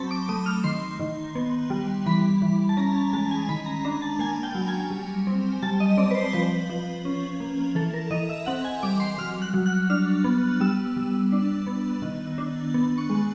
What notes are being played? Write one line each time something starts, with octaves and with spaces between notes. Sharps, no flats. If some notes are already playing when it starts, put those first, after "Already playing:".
Already playing: F#3 C4 A5 B5 C#6
D6
A3 D#6
F6
D#3 C6
D#3
B3
G3
E3 B5
E3
A5
C#4 A#5
A5
G#3 A5
G#5
D#3 B5
A#5
D4 A#5
A5
A#3 G#5
G5
F#3
G#5
G3
C4
G3 A5
D#5
C4 D5
B4
C5
F3 B4
F3
C#4
A#3
E3 A4
A#4
E3 D#5
E5
C4 F#5
G#5
G3 D6
C6
F#3 F6
F#6
F#3
F#6
D4 F6
B3
G3 E6
G3
D4
B3
D#3
D4
B3
C#6
G#3